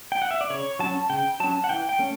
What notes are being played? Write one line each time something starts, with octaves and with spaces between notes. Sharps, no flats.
G5
F#5
E5
D5
C#3 C#5
F#3 C#4 A5
C#3 G5
F#3 C#4 A5
F#5
E3 G5
G5
A3 C#4